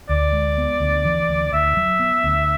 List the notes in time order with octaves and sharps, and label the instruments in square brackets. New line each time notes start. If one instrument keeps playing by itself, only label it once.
[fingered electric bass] D2 [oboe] D5
[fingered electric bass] G#3
B3
D2
E3
D2
[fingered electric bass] D2 [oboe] E5
[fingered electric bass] F#3
B3
D2